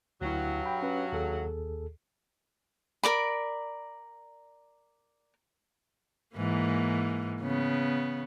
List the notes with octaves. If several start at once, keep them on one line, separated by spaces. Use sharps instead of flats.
D2 G2 F#3 E4
G5 B5
C#4 B4
D#2 G#4 A4
A#4 D5 B5
G#2 E3 A#3
C#3 B3